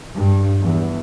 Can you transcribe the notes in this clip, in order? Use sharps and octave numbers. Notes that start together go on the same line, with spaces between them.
G2
E2